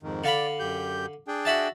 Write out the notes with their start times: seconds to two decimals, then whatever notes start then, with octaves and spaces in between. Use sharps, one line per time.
0.03 F2 G#2 D#3
0.24 D3 D5 F5 B5
0.60 F#2 G4 G6
1.28 D4 G#4 G5
1.45 F#4 E5 A5